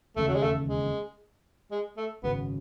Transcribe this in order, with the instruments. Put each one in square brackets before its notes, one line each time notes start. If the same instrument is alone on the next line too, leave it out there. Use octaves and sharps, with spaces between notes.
[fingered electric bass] E1 D#2 C#3 [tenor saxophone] A3
[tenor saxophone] F#3
G#3
A3
G#3
G#3
A3
[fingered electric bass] G#1 F#2 C#3 [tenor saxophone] B3